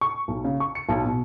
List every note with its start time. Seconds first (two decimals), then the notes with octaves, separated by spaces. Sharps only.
0.01 C#6
0.28 B1
0.45 C#3
0.60 C#6
0.75 C#7
0.89 B1
1.05 B2